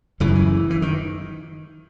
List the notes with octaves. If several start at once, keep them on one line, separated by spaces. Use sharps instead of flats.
F#1 F#2 C#3 E3
D#3
E3
E3
D#3